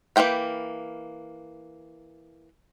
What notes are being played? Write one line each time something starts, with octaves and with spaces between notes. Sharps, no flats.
E3 F3 A#3 G5 B5